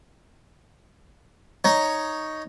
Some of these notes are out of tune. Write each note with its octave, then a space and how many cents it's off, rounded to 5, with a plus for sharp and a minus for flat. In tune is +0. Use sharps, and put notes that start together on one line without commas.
D#4 +0 C#5 +5